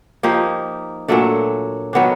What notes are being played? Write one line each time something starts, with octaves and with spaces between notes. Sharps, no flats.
F3 A#3 D#4 G4
A#2 F#3 A3 D4
D#3 F#3 B3 D4